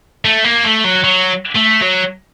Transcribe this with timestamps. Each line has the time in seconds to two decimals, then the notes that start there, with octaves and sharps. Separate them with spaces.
0.25 A3
0.44 A#3
0.64 A3
0.84 F#3
1.04 F#3
1.56 A3
1.82 F#3